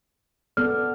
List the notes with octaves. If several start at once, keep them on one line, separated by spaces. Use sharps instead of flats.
B3 A4 D5 F6